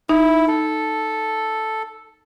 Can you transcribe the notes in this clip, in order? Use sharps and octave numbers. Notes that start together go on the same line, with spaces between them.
D#4 E4
A4